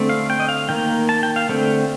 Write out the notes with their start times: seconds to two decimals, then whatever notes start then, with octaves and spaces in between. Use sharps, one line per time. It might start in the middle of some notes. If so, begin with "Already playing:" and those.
Already playing: D3 A3 C4
0.09 F5
0.30 G5
0.40 D#5
0.49 F5
0.69 D#3 A#3 G5
1.09 A5
1.23 G5
1.36 F5
1.49 D3 A3 C4 G5